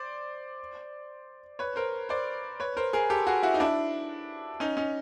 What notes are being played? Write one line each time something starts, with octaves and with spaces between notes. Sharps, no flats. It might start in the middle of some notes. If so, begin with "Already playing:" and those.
Already playing: C5 D5
B4 C#5
A#4 C5
C5 D5
B4 C#5
A#4 C5
G#4 A#4
G4 A4
F#4 G#4
E4 F#4
D#4
D4 E4
C#4 D#4
C#4 D#4